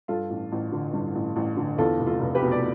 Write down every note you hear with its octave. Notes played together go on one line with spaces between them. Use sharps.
G2 F4 A4
A1
A1
D3
G2
A1
A1
D3
E2 F4 A4
F1
F4 A4
F1
G4 B4
B2
D5